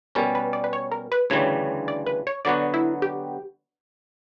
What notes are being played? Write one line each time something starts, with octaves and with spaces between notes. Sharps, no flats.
B2 G3 C#4 A#4
B4
D5
B4
C#5
A#4
B4
D2 C#3 E3 G3 C#5
D5
B4
C#5
D3 F#3 B3 F#4 D5
E4
G4